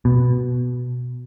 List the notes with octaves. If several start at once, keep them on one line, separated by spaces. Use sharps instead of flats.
B2